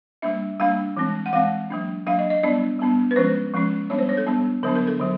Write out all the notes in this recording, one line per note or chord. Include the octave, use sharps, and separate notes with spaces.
G3 A#3 D4 E5
G3 A#3 D4 F5
E3 G#3 C4
F#5
E3 G#3 C4 F5
F#3 A#3 D4
F#3 A#3 D4 F5
D#5
D#5
G3 B3 D4 D5
G3 B3 D4
B4
F3 G#3 C#4 C5
F3 G#3 C#4
G3 B3 D4 C#5
C5
C#5
A4
G3 B3 D4
D3 F#3 B3 D4 A#4
A#4
A4
D3 F#3